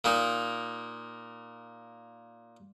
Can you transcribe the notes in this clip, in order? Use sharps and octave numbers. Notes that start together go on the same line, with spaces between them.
A#2 A#3 D#4